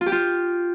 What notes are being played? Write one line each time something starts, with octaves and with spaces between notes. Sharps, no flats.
F4
G4
F4